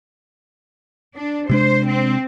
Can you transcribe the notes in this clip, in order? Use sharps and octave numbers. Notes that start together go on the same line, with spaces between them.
D4
C3 G#3 D4 C5
C4